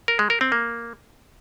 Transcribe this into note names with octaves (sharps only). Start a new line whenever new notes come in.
A#4
G#3
A#4
C4
A#3